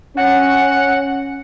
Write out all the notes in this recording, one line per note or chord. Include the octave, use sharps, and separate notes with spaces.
C#4 F#5